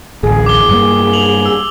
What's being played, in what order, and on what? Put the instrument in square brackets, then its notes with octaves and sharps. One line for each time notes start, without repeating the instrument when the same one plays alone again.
[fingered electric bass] D1 A1 [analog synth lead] G#4
[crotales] D6 G7
[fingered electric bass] G2 G3 A#3
[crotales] F7 F#7
E6